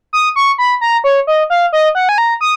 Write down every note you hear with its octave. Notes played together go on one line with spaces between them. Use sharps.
D#6
C#6
B5
A#5
C#5
D#5
F5
D#5
F#5
G#5
A#5
D#6